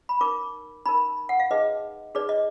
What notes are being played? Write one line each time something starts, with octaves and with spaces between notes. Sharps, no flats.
B5
D#4 A#4 D6
D#4 A#4 B5
F#5
F5
D#4 G#4 B4 D#5
D#4 G#4 B4 D5
D#5